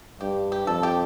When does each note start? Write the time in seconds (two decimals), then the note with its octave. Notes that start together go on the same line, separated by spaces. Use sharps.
0.21 G2 G4
0.52 G4
0.67 F2 A4
0.83 G4